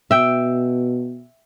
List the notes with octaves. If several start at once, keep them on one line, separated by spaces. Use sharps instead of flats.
B2 E5 G5